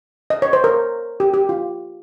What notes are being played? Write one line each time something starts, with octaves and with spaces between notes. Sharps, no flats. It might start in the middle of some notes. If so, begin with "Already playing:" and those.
D#5
C#5
C5
A#4
G4
G4
F4